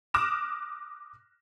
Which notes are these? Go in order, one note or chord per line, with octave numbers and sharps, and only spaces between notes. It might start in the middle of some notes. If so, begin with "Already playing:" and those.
D6 D#6 F6 F#6 A#6 E7